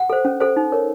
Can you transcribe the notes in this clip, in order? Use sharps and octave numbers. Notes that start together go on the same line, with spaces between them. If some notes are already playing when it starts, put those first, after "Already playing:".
Already playing: F#5
A4 C5
C#4
A4 C5
D#4
A#4 C#5